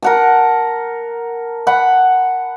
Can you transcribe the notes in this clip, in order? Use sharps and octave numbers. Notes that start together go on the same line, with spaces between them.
A#4 F#5 A5
F#5 B5